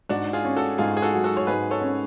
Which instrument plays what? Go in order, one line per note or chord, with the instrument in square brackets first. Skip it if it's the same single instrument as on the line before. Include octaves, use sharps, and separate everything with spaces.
[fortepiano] G#2 [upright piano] D4 F#4
[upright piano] F4 G#4
[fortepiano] C#4
[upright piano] F#4 A4
[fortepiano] G#2 [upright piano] F4 G#4
[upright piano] G#4
F#4 A4
[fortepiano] F#3
[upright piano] F#4 A4
C#5
[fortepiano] G#2 [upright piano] G#4 B4
[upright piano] A4 C#5
[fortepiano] C#4